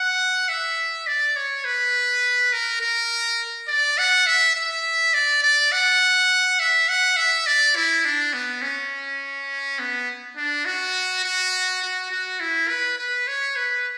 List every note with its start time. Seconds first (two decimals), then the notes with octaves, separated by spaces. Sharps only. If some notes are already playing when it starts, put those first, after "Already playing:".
Already playing: F#5
0.48 E5
1.07 D5
1.36 C#5
1.65 B4
2.53 A#4
2.81 A#4
3.68 D5
3.98 F#5
4.27 E5
4.55 E5
5.14 D5
5.42 D5
5.72 F#5
6.59 E5
6.89 F#5
7.16 E5
7.46 D5
7.76 E4
8.05 D4
8.33 B3
8.62 C#4
9.79 B3
10.37 D4
10.65 F#4
11.24 F#4
11.82 F#4
12.11 F#4
12.40 E4
12.69 B4
12.98 B4
13.27 C#5
13.56 B4